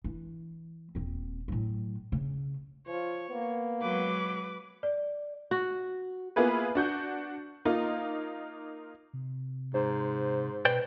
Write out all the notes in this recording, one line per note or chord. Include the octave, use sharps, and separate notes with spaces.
E3
D#1 C4
A2 F#3
C#3
F3 F4 C#5
A#3 B3
F#3 G#3 B4 D6
D5
F#4
A#3 B3 E4 F4 G#4 B4
D4 F#4 G6
A#3 D#4 F4
C3
G#2 C5
B2 B4 C5 D5 G5